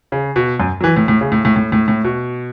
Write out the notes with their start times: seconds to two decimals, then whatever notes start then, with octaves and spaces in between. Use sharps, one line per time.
0.12 C#3
0.36 B2
0.60 F#2
0.81 F#3
0.84 E3
0.96 A2
1.08 A2
1.21 C#3
1.32 A2
1.45 A2
1.56 A2
1.72 A2
1.88 A2
2.04 B2